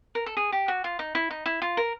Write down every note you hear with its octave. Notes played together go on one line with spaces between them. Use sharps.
A#4
A4
G#4
G4
F#4
F4
D#4
E4
D#4
E4
F4
A#4